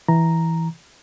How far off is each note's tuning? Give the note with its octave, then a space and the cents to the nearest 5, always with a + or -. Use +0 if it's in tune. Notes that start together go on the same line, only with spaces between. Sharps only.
E3 +0 A#5 +0